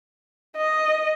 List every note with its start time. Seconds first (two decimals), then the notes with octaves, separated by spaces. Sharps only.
0.56 D#5